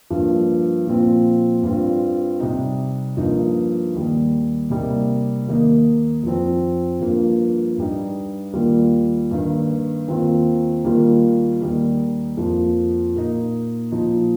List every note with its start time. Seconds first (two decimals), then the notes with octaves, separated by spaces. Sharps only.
0.10 G2 F3 A#3
0.86 A#2 F3 C4 F4
1.63 G2 G3 C4 F4
2.40 C3 G3 D#4
3.17 G2 F3 A#3 D#4
3.94 D#2 D#3 G3
4.70 C3 G3 A#3 D#4
5.47 D#2 D#3 A#3 D#4
6.23 F2 F3 C4
7.00 G2 F3 A#3
7.78 G2 G3 D#4
8.54 D#2 D#3 G3 A#3 F4
9.31 G2 D#3 A#3
10.07 D#2 D#3 C4 F4
10.84 D#2 D#3 G3 A#3 F4
11.61 D#2 D#3 G3 D#4
12.37 F2 F3 A#3
13.15 A#2 A#3 D#4
13.92 A#2 F3 D#4